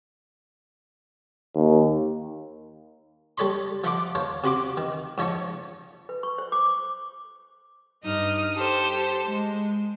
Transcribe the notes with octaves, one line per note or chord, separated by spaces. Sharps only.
D#2
G3 A4 C#5 B5 C6
F3 E5 F#5 B5 C6 D6
C5 C#5 F5 A5
C3 F#4 B5 C6 D6
D#3
G#2 F3 C#5 A5 C#6
B4
C#6
C5
D6
G2 D#4 D#6 F6
G4 A4 C5
G#3